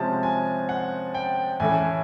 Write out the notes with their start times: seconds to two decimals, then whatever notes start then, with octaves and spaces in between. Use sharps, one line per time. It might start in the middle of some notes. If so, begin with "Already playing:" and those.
Already playing: C3 F3 G#3 C#4 A5
0.23 G#5
0.69 F#5
1.14 G5
1.60 A2 E3 A3 C#4 G#5